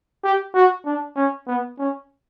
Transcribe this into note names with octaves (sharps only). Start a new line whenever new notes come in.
G4
F#4
D4
C#4
B3
C#4